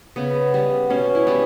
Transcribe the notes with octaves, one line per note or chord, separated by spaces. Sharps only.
C#3 B3
G3 B3
B2 C#4
E4
G3 B3